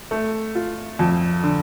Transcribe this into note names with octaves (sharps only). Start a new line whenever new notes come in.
A3
F4
F2
D3